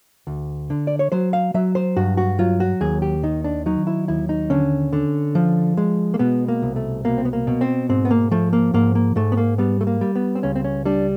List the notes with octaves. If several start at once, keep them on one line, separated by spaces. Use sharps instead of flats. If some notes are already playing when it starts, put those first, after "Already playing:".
D2
D3
D5
C#5
F#3 C5
F5
F#3 E5
C5
G2 F#4
F#4
F#3 F4
F#4
D#2 G#4
G4
D#3 D#4
D4
F#3 D#4
E4
D#2 E4
D#4
D3 C#4
D3
F3
G#3
A#3
B2 B3
A#3
C2
A3
B2 A#3
C4
B3
A#3
B2
C4
G#2 C4
B3
A#3
F3 A3
A#3
G#2 A#3
A#3
G#2 A3
B3
A#3
G3 B3
A3
A#3
G3
B3
C4
C#2 C#4
C4
C#4
G3 D4